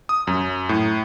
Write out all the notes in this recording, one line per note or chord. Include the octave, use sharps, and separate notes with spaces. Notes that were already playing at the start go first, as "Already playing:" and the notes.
D#6
F#2
A2